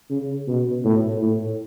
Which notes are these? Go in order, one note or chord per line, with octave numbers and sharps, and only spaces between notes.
C#3
B2
A2
A2